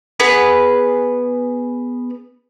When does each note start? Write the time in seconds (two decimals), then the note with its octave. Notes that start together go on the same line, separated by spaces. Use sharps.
0.20 B3 G#4 B4